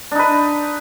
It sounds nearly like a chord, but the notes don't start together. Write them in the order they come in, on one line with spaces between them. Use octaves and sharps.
D4 D#4 B4